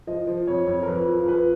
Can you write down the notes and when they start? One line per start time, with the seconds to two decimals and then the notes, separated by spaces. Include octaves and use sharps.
0.07 F3 D#5
0.27 F3
0.47 F2 C#5
0.67 F2
0.83 A#4
0.88 F2 B4
1.08 F3
1.24 A#4
1.28 F3 B4